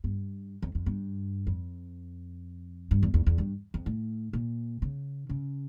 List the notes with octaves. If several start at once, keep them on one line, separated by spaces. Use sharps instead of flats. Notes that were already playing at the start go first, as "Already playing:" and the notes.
G2
F2
F2
G2
F2
G2
E2
E2
E2
G2
F2
A2
A#2
C#3
C#3